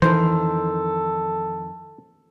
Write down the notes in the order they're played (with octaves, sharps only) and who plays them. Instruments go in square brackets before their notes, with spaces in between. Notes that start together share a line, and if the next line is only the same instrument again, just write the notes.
[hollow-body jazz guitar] F2 D#3 D#4 [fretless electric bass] E3 [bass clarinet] A4 [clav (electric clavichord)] C5